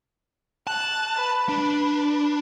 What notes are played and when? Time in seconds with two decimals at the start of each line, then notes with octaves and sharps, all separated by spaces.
0.67 A5 F#6
1.16 B4
1.49 D4 B4